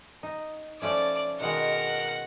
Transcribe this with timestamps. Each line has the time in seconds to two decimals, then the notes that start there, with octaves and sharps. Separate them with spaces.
0.23 D#4
0.82 F3 A3 C#4 D5
1.41 B2 D#3 G#3 A#4 F#5